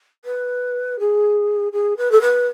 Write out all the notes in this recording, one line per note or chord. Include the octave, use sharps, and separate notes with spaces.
B4
G#4
G#4
B4
A4
B4